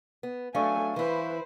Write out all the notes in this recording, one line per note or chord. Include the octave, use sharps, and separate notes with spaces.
B3
F#3 A3 C#4 D4 A4 F5 G#5 C#6
E3 E4 B4 C5